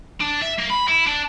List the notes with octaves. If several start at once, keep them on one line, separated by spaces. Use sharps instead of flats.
D4
E5
A#3
B5
E4
D4